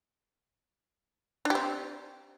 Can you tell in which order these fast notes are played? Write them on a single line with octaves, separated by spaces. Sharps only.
D4 G4 C4